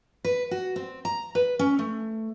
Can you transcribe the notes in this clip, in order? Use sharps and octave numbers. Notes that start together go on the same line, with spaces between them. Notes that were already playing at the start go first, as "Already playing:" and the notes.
B4
F#4
C4
A#5
B4
C#4
A3